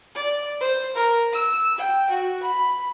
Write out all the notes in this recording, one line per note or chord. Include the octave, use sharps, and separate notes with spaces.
D5
C5
A#4
E6
G5
F#4
B5